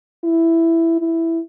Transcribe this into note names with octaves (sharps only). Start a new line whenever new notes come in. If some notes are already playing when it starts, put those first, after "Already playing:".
E4
E4